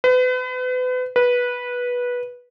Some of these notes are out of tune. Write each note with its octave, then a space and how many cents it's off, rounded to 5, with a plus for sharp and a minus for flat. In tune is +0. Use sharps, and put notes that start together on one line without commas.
B4 +35
B4 -15